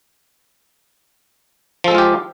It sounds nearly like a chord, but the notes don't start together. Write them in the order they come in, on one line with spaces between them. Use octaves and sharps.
F3 A4 G#3 F4 G4